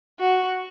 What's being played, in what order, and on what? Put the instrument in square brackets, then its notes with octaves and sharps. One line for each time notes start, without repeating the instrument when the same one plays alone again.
[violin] F#4